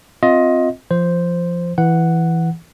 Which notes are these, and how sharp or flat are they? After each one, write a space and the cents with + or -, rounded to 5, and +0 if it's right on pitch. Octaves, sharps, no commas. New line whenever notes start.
C4 +0 F4 +15 D#5 +20
F3 -15 C5 +0
E3 +0 F#5 +0